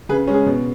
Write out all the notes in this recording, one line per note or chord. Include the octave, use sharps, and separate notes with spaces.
C#3 G#4 B4
G#3 C#4
G#4
B2